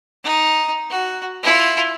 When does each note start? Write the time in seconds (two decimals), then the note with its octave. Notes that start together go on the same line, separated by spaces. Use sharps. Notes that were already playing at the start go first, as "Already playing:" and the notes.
0.24 D#4
0.90 F#4
1.43 E4 F4